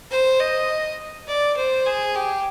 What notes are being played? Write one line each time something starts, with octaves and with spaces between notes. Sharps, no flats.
C5
D#5
D5
C5
G#4
G4